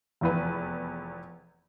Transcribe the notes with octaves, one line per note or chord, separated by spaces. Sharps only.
F1 E2 B4